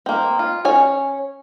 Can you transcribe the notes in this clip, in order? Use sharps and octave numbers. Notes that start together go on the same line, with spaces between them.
A#3 C4
F4
C#4 C#5 G#5